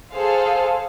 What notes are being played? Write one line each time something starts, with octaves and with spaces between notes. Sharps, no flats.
G#4 A4 C5 F5